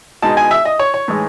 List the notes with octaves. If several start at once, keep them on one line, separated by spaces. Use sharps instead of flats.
B2 G#3 D#4 A5
G#5
E5
D#5
C#5
C#5
A2 E3 G#3 D#4